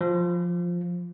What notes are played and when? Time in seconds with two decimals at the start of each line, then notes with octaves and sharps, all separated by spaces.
0.01 F3